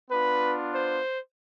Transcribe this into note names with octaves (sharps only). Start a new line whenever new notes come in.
B3 D4 F4 B4
C5